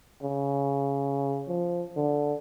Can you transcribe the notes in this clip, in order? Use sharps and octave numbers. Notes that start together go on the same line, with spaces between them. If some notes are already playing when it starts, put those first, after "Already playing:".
C#3
F3
D3